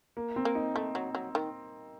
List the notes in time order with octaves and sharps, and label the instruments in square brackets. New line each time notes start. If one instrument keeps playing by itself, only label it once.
[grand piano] A#3
C4
[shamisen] A#3
[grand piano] D#4
[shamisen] A3 [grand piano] D#4
[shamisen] F#3
F#3
D#3